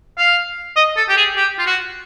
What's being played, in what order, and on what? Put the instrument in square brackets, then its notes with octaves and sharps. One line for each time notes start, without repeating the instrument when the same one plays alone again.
[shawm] F5
D#5
A4
G4
G#4
G4
F4
F#4